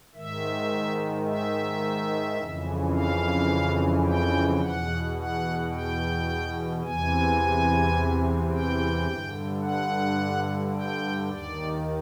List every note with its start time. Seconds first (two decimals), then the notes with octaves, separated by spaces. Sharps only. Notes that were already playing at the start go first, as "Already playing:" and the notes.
0.15 G#2 D#3 E5
1.26 E5
2.38 F2 C#3 E3
2.94 F5
4.05 G5
4.61 E2 B2 F#5
5.16 F#5
5.72 G5
6.83 E2 C3 E3 G#5
8.51 G5
9.07 G2 D3
9.62 F#5
10.74 G5
11.29 D#2 D#3 D5